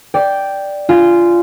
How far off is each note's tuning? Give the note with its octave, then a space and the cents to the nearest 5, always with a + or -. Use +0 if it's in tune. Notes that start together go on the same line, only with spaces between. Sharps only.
D5 +0 G5 +0
F4 -15 G#5 +0